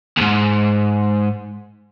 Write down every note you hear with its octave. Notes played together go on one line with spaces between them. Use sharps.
D2 G#2